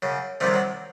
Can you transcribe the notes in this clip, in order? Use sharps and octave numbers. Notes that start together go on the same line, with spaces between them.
F#2 C#3
C2 C3 D#3 F3 A3
F#3